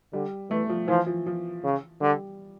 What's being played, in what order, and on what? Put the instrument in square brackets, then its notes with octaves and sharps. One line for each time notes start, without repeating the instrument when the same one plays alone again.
[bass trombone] D3 [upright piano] G3
[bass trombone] E3 [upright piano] A3
[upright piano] F3
[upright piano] E3 [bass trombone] F3
[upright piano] F3
F3
[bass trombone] C#3
[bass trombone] D3 [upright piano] G3